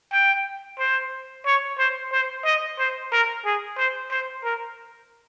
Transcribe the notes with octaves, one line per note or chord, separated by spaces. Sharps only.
G5
C5
C#5
C5
C5
D#5
C5
A#4
G#4
C5
C5
A#4